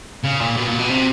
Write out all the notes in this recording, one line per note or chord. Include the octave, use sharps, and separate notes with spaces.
C#3
A#2
B2
A#2
B2
C3